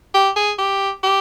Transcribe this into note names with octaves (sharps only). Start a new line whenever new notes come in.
G4
G#4
G4
G4